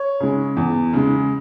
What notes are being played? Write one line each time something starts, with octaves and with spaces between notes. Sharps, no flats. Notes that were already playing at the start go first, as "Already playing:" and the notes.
Already playing: C#5
C#3 G#3
E2
C#3 G#3